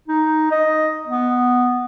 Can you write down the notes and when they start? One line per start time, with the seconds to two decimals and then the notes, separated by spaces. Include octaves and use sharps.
0.08 D#4
0.51 D#5
1.08 B3